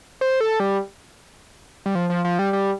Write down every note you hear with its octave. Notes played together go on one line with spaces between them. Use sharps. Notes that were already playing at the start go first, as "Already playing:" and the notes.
C5
A4
G3
G3
F3
F3
F3
G3
G3